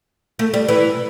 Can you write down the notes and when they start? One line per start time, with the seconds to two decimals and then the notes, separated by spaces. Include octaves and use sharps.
0.39 A3
0.53 G3
0.68 E3